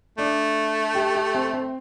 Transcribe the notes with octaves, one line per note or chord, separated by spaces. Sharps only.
A3 D4
G4
G4
C4
C4